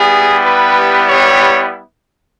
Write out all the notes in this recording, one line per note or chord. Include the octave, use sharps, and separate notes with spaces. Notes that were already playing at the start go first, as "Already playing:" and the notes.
Already playing: G3 B3 E4 G4 G#4
B4
C#5